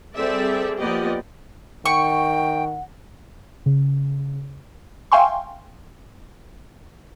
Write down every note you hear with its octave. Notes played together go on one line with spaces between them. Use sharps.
G3 C4 G#4 A4 D5 E5
F3 A#3 B3 G4 D5 D#5
D#3 F#5 G5 C#6
C#3
E5 F5 G5 G#5 C6 C#6